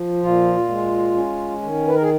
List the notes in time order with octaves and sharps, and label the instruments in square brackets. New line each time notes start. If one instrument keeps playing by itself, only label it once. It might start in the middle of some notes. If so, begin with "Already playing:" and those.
Already playing: [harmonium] F3
A#2 F4
G#3
C#4
D#3
B4
A#4
G#4